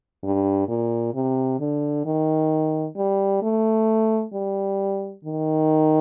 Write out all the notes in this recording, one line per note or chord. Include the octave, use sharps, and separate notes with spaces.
G2
A#2
C3
D3
D#3
G3
A3
G3
D#3